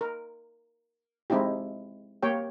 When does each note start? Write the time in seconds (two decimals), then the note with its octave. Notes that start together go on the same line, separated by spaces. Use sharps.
0.01 A#4
1.30 G#3 C4 D#4 E4 G4
2.23 A#3 G4 C#5 G5